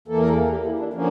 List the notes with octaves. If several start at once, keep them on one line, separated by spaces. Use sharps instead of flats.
E2 E3 A#3 A4
A#4
A4
G4
E4
D4
D3 F3 A#3 C#4